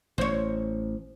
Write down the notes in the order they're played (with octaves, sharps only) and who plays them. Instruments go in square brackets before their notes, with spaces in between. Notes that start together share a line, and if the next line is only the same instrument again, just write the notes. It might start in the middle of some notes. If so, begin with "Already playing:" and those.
[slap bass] A1 [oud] C5 C#5